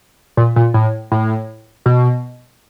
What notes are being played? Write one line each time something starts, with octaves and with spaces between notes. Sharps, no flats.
A#2
A#2
A2
A2
B2